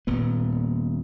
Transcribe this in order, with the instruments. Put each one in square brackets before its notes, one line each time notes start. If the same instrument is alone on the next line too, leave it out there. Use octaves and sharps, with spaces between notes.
[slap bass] D#1 A#2 B3